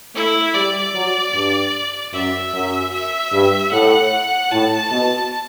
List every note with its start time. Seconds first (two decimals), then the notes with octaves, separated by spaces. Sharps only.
0.15 A3 E4
0.54 G3 D5
0.95 F#3
1.34 G2
2.13 F#2 E5
2.54 F#2
2.93 E5
3.33 G2
3.72 A2 F#5
4.52 A2 A5
4.91 B2